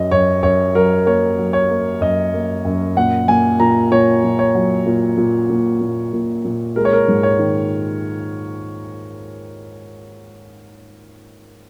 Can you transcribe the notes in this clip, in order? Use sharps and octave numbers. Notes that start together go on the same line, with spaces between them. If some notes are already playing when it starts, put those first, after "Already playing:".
Already playing: F#2 F#3 D#5
F#2 C#5
F#2 C#5
F#3 A#4
A#3 C#5
F#3
C#5
A#3
F#2 D#5
A#3
F#2
A#2 F#5
A#2 G#5
A#2 A#5
A#2 C#5
A#2
C#5
F#3
A#2
A#2
A#2
A#2
A#2
A#2
G#3 A#4
C#5
A#4
G#2
C#5
D#3